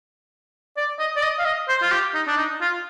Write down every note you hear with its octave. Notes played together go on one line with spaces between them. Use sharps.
D5
D#5
D5
D#5
F5
D#5
C5
F4
G4
D#4
D4
D#4
F4